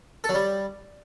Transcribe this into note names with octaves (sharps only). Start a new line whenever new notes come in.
A4
F#3
G3